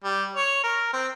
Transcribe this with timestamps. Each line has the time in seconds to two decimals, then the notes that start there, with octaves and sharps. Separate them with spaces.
0.04 G3
0.36 C#5
0.64 A#4
0.93 C4